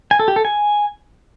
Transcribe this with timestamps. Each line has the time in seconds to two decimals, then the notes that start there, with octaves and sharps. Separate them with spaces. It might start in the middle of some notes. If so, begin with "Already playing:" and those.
0.11 G#5
0.19 A4
0.28 G4
0.36 A4
0.45 G#5